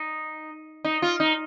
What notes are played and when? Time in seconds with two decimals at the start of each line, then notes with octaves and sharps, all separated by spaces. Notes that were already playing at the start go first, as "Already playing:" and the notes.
Already playing: D#4
0.84 D#4
1.02 F4
1.20 D#4